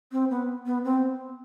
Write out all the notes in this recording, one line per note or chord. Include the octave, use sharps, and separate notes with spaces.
C4
B3
B3
C4